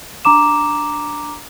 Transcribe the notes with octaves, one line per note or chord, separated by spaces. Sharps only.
D4 A#5 D6 E7